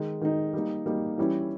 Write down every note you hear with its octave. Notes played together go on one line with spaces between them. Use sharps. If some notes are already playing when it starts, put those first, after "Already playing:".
Already playing: D#3 G#3 D#4
D#3 G#3 D#4
G3 A#3 D#4
G3 A#3 D#4
E3 G3 C#4 E4